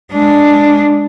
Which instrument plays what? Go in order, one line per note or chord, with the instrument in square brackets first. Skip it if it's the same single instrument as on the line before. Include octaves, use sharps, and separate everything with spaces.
[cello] G#3 D4